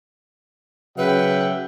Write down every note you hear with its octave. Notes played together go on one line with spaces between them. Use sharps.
C#3 F#3 B4 E5 F#5 G5